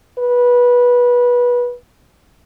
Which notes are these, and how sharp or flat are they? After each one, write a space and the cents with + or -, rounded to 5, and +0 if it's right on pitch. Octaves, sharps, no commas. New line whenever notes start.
B4 -20